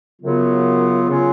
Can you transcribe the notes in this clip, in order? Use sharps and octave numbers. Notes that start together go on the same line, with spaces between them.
F#2 C#3 F#3 B3 F4
C#3 F#3 C#4 F4